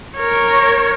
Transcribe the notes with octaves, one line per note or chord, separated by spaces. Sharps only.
A#4 C#5